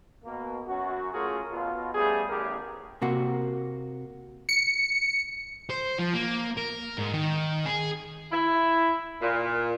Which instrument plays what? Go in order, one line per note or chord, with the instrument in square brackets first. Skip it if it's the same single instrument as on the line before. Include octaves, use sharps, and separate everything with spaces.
[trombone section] B2 A#3
F#2 F#4
A3 C#4 F4 F#4 G#4 A#4
B2 F4
G3 A3 B3 C#4 G#4
A1 E2 A3 G4 G#4 A#4
[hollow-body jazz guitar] C3 A#3 F#4
[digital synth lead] C#7
[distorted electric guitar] C5
F3
A#3
A#4
G#2
D#3
G#4
[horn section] E4
A#2